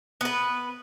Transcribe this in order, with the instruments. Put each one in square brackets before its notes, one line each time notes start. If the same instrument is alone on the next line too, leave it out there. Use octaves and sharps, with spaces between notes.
[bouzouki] B3 B4